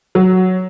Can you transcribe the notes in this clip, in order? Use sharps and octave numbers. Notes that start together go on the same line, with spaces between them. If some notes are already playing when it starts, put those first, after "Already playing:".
F#3